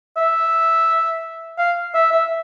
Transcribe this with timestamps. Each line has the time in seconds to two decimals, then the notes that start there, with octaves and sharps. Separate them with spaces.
0.17 E5
1.58 F5
1.94 E5
2.12 E5